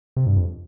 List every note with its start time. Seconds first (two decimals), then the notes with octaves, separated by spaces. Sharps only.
0.16 C3
0.26 G2
0.37 F2